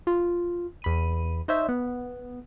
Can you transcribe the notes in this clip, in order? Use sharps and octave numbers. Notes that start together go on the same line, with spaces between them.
F4
E2 B5 D#7
D#4 C5 C#5 E5
B3